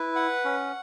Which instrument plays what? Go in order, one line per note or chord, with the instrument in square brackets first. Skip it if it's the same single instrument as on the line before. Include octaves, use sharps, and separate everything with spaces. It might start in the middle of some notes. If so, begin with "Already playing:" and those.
Already playing: [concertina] E4 B4
F#5
C#4